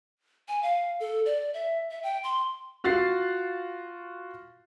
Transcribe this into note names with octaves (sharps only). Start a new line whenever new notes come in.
G#5
F5
A4
D5
E5
E5
G5
C6
F4 F#4 F5 A6 C7